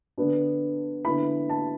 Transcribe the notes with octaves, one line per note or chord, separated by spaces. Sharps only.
D3 B3 D4
D3 B3 E4 B5
A5